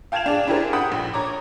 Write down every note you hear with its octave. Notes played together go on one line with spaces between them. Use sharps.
F5 G5 A5 G#6 E7 F7
D4 G#4 D5
D4 E4 G4 G#4 A#4 C5
F#5 G5 B5 D#6
A#1
C#5 A#5 D6